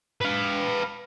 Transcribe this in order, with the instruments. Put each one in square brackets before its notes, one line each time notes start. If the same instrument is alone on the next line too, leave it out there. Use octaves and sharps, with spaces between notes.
[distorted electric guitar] B4 F5